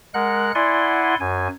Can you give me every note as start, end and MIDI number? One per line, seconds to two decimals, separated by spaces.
0.14 0.52 56
0.14 0.52 70
0.14 0.52 78
0.14 0.52 90
0.55 1.15 64
0.55 1.15 74
0.55 1.15 78
0.55 1.15 80
0.55 1.15 84
1.20 1.48 42
1.20 1.48 80